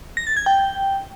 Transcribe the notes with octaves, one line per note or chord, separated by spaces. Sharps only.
A#6
A6
G#6
G5